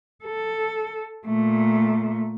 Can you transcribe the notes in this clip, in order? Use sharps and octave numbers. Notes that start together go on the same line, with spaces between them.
A4
A#2 A3